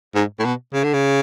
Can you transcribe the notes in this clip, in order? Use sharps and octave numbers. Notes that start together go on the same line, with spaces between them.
G#2
A2
B2
C#3
D3
C#3